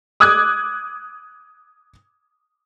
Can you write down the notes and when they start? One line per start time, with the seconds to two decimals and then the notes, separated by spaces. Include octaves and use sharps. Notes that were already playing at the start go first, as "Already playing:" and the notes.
0.20 D6 D#6 F#6 G#6